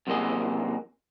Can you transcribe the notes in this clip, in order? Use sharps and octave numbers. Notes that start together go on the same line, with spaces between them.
F#2 C3 E3 A#3 G#4 D#5